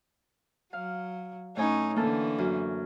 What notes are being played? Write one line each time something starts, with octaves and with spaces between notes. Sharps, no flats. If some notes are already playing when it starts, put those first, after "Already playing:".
F#3 F5
A2 C#4 D#4 C#5 G#5
D3 E3 A#3 C#4 A4
F#2